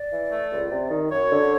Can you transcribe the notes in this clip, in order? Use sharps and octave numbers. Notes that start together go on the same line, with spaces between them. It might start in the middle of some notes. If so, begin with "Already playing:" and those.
Already playing: D5
E3
A3
C#2
C3
D#3
F#2 C#5
D3